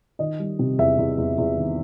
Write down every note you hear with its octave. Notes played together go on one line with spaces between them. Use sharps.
D#3 D#5
G3
C3
E2 E5
E2
E2
E2
D#3